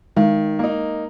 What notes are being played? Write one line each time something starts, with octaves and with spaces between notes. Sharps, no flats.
D#3 G#3
A#3 D#4